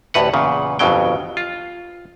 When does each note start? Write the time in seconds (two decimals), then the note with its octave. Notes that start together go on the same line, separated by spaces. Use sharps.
0.14 A1 D2 A2 B4 F#5
0.34 E2 A#2 C#3
0.79 G1 F2 B2 F#3 G5
1.37 F4